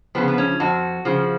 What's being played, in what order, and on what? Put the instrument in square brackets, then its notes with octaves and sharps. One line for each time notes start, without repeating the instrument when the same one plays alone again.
[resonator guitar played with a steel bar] C#3 F3 B3
B3
C#4
F2 F#4
C#3 F3